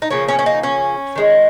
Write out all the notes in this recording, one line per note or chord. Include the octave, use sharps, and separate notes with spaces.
D#4
C#3 F3 A#3 C#4
C#4
C#4
D#4
C#4
D#3 G#3